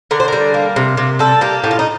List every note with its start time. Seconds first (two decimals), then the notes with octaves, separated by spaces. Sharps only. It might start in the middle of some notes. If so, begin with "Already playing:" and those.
0.11 D3 A#4
0.20 C5
0.28 G3 A#4
0.54 A#3
0.76 C3
0.97 C3
1.19 G3 A4
1.41 A#3 G4
1.64 A2 G4
1.71 F4
1.79 D#4